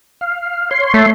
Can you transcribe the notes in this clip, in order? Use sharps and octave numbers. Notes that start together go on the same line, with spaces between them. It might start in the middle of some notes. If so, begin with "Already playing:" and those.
F5
C#5 C6
A3